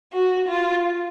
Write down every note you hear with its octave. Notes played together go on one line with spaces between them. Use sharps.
F#4
F4